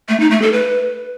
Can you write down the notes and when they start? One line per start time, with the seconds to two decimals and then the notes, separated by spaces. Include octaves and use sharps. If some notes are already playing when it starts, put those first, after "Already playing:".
0.09 A3
0.20 D#4
0.31 A3
0.42 A4
0.53 B4